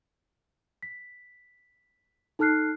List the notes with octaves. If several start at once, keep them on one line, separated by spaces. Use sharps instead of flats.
B6
D#4 A4 A5 F6 F#6 C7